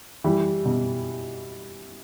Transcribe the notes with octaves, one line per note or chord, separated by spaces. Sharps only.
E3 G3
B2